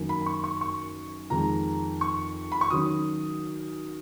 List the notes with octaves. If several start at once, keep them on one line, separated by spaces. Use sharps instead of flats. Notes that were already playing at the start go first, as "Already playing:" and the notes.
Already playing: F#2 D#3 A#3
B5
B5
C#6
C#6
C#6
F2 D#3 G#3 A#5
C#6
B5
C#6
D#3 F#3 C#4 D#6